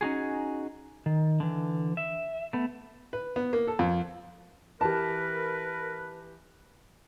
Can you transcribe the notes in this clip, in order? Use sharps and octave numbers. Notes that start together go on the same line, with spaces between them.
C#4 D#4 F#4 G#4
D#3
D3 E3
E5
A3 B3
B4
B3
A#3
A4
F2
E3 G4 A#4 B4 A5